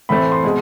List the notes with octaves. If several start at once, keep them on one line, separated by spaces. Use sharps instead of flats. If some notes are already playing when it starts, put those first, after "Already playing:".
A2 E3 A3 C4 B5
C6
B2 G#3